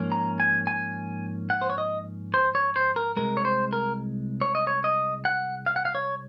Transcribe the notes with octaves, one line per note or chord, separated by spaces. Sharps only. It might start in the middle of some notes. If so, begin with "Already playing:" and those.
Already playing: G#2 F3 A#3 C#4
A#5
G#5
G#5
F#5
C5
C#5
D#5
C5
C#5
C5
A#4
C2 A#2 G#3 A#4
C#5
C5
A#4
C#5
D#5
C#5
D#5
F#5
F5
F#5
F5
C#5